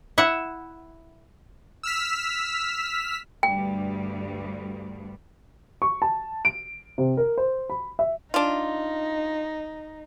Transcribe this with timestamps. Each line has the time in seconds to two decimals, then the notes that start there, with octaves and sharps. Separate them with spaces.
0.18 E4 E5 F#5
1.83 E6 F6 B6
3.43 D2 G2 G3 G5
5.82 C#6
6.02 A5
6.45 D7
6.98 C3
7.17 A#4
7.38 C5
7.70 B5
7.99 E5
8.34 D4 D#4 F4